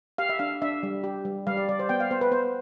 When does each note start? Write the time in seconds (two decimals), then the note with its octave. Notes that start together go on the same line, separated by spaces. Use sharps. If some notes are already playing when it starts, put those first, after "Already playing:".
0.18 G4 F5
0.29 E5
0.39 D4 F5
0.62 D4 E5
0.83 G3
1.04 G4
1.25 G3
1.47 G3 F5
1.57 D5
1.69 G3 D5
1.79 C5
1.89 B3 G5
2.00 F5
2.11 B3 C5
2.21 B4
2.32 B3 C5